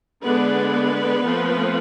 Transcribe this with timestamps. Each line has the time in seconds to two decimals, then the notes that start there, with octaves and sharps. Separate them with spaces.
0.22 D3 G#3 B3 D4 B4
1.24 F3 A3 C4